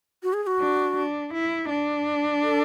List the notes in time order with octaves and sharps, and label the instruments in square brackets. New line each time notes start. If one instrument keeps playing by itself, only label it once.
[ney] F#4
G#4
G#4
F#4
[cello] D4
D4
E4
D4
[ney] A4